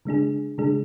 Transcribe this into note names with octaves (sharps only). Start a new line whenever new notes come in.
C#3 G#3 D4 G#4
C#3 G#3 D4 G#4